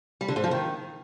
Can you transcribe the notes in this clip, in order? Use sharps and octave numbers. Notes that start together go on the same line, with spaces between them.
G3
D3
G#2
F3
D#3